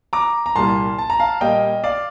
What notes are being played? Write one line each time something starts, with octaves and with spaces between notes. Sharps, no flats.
A#5 D6
A#5
C2 A#2 G3 A#3 A5 C6
A5
A#5
F5 A5
A#2 G3 A#3 D#5 G5
D5 F5